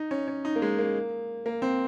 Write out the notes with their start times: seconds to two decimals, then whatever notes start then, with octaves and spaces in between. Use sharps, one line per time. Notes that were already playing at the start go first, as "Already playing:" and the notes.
Already playing: D#4
0.11 C#4
0.28 C#4
0.45 D#4
0.56 A#3
0.62 G#3
0.78 A#3
1.46 A#3
1.62 C4